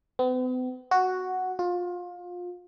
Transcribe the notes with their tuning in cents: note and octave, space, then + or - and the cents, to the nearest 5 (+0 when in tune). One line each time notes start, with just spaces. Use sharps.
B3 +45
F#4 +0
F4 +25